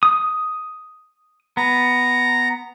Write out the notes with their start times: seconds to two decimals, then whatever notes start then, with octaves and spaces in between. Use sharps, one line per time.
0.03 D#6
1.57 B3 A#5